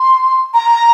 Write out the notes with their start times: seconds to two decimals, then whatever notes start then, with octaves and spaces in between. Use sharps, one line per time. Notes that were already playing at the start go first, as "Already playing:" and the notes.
Already playing: C6
0.53 A#5